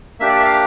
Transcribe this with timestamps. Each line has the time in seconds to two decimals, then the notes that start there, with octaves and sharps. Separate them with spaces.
0.20 A#3 D4 G4 E5
0.29 D5
0.37 E5
0.45 F5